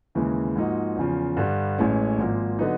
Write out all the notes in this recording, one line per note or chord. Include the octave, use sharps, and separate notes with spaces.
D#2 C#3 E3 G#3
G#2 F3 A#3 D#4 F#4
E2 C#3 F3
G2 D3 G3
A1 A2 E3 G#3 C#4
G#1 G#2 F3 A#3
D3 F#3 B3 D#4